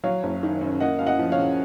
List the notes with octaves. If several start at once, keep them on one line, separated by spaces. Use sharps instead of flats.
F#3 C#5 F5
F#1
D#3
F#2
A#3 D#5 F#5
F#2 F5
D#5 F#5
F3
C#5 F5
C#3